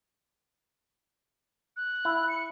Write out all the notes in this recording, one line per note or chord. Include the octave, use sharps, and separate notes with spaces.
F#6
E4
C#7